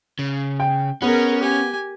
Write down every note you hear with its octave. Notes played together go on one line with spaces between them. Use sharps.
C#3
G5
B3 C#4 G#4 A#4
G4 G#5